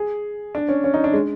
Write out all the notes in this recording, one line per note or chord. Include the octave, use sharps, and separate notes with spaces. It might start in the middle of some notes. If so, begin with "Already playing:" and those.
Already playing: G#4
D4
C#4
C#4
D#4
D4
G#3